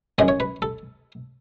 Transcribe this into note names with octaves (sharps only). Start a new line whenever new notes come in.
F#2 E3 G#3
C#5
B4
A4